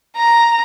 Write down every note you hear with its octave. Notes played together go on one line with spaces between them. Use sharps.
A#5